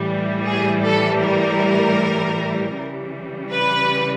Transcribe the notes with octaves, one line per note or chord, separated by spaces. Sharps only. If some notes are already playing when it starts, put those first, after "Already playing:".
Already playing: A2 E3 G3
G#4
A4
A#4
C#3 E3 G3
B4